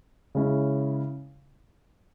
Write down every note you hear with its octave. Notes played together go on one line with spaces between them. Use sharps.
C#3 G#3 C#4 E4